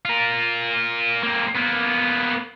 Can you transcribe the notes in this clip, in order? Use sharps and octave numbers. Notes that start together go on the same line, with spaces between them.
F4 A#4
A#3 C4
A#3 B3